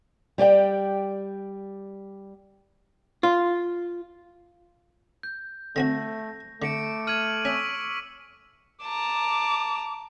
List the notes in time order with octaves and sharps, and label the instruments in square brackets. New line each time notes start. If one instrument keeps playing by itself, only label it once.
[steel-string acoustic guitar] G3 G4 D5 G5
[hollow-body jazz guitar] F4
[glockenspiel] G6
[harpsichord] D3 C4 F#4 [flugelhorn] A3 [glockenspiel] A#6
[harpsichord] D3 [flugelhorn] A3 [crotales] D6 C#7 D7
[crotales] D6 D#7 F#7 [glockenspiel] F6 G#6
[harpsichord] C#4 [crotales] C#6 E6 B6
[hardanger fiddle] A5 A#5 [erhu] D6